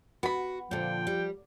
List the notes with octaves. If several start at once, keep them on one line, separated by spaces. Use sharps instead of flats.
B3 F#4 B5
A#2 D3 F3 G5
G3